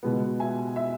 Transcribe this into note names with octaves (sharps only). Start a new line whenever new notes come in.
B2 G#3 B3
E5 G#5
E5